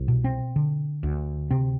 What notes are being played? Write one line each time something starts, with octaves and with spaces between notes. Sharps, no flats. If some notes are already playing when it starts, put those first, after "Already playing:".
Already playing: C2
B2
C4
D3
D2
C3 C4